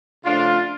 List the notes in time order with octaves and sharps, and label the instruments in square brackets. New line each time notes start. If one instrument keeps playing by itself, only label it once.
[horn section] C#3 F3 A3 D4 F4